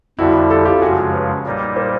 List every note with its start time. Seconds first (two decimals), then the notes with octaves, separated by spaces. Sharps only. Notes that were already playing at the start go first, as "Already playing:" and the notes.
0.19 F2 D3 G3 E4 F#4
0.50 G4 A4
0.65 F4 G4
0.82 F#2 C#3 F3 G#3 F#4 G#4
1.14 B4 C#5
1.46 A#2 G3 A#3 D#4
1.76 A#4 C5